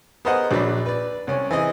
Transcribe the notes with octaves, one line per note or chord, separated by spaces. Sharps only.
B3 G#4 A#4 C5 D#5 F#5
A#1 F#3 D5 B5
B4 D5
C2 C#4
E3 C4 G#4 D#5